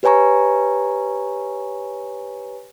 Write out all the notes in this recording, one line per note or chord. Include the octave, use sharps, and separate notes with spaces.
G4 B4 C#5 G#5 A#5 C#6